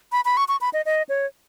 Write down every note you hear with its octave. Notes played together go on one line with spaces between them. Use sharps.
B5
B5
C#6
C#6
B5
D#5
D#5
C#5